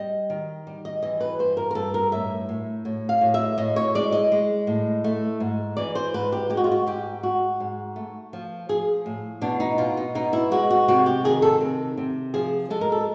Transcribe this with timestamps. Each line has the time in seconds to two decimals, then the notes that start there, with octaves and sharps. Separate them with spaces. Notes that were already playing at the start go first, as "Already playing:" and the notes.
Already playing: G3 D#5
0.30 D#3
0.67 G3
0.85 D#5
1.02 E3 D#5
1.20 B4
1.39 G2 C5
1.57 A#4
1.71 A#4
1.75 G2 A4
1.94 A#4
2.12 A2 E5
2.49 A2
2.85 A2
3.09 F5
3.21 A2
3.34 E5
3.58 A2 D#5
3.76 C#5
3.95 G#3 D5
4.12 D#5
4.32 G#3
4.67 A2
5.04 A3
5.40 G#2
5.77 E3 D5
5.95 C5
6.14 G#2 B4
6.32 G4
6.50 G#3 G4
6.57 F#4
6.64 F4
6.71 F#4
6.87 G#2 G4
7.23 G#2 F#4
7.60 G#2
7.96 A3
8.33 F3
8.69 F3 G#4
9.06 A2
9.41 B2 D4
9.60 D#4
9.78 B2 F4
9.97 D#4
10.15 B2 D#4
10.33 E4
10.51 G#3 F#4
10.71 F#4
10.88 C3 F#4
11.06 G4
11.25 D#3 G#4
11.42 A4
11.61 C3
11.98 C3
12.34 F3 G#4
12.70 G#3 A4
12.81 A#4
12.92 A4